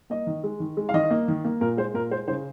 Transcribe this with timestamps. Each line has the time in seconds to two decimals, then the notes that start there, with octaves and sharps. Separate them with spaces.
0.10 A#3 D#5
0.27 D#3
0.44 G#3
0.60 D#3
0.77 G#3
0.89 F5
0.94 D#3 D#5
1.10 A#3
1.28 D#3
1.45 A#3
1.61 A#2 A#4
1.77 G#3 C5
1.94 A#2 A#4
2.11 G#3 C5
2.28 C#3 C5